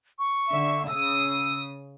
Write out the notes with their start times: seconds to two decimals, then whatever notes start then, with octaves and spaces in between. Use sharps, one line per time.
0.19 C#6
0.48 D3 E5
0.88 C#3 D#6 E6